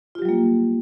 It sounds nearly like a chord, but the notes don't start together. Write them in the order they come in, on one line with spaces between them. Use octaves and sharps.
F4 G4 F#3 G3 A#3